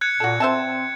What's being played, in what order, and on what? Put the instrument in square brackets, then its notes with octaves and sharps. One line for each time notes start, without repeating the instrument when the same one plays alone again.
[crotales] F#6 G#6 C#7
[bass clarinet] A#2 [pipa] F#4 A4
[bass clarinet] C4 [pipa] C5 E5 A5